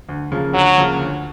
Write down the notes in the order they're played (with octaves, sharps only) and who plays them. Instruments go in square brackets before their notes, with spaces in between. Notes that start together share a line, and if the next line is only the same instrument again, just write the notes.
[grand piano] D2
C#3 F3 A#3
[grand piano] D2 [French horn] F#3
[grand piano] C#3 F3 A#3
D2